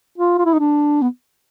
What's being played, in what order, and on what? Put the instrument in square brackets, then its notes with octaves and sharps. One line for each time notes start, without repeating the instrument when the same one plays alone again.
[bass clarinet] F4
F4
E4
D#4
D4
B3